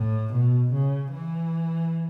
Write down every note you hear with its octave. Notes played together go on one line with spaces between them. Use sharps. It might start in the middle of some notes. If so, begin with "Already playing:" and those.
Already playing: A2
B2
C#3
E3